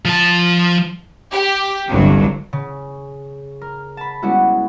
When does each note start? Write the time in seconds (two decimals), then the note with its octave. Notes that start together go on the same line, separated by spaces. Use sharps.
0.05 F3 A5
1.31 G4
1.89 G1 C2 G2 F#3
2.53 C#3
3.62 A#4
3.97 A5 B5
4.22 G3 G#3 B3 C#4 E4 F#4